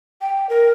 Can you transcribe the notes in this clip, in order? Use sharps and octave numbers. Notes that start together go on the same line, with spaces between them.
G5
A#4